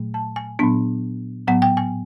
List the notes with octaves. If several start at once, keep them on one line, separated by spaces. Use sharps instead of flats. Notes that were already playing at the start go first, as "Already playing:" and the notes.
Already playing: A#2 F#3 A3
A5
G#5
A#2 F#3 B3 D4
A2 F#3 B3 F#5
G5
G#5